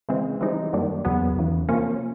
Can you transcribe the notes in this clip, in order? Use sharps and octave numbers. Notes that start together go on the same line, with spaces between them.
C#3 E3 G#3 C4
E3 G3 C4 D#4 G#4
F#2 D#3 G3 A#3 D4
E2 C#3 F#3 B3
E2 C#3 E3
C3 F3 A#3 C#4